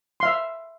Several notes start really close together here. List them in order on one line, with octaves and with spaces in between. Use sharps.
C6 F5 E5